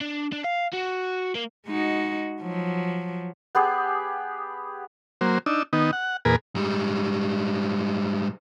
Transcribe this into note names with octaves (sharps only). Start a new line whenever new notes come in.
D4
D4
F5
F#4
A#3
G#3 D#4 F#4
F3 F#3
B3 G4 G#4
F#3 A#3 C5
D4 D#4 E6
D#3 B3 D#4
F#5
E2 A#2 G#4 A#4 B4
G#2 G3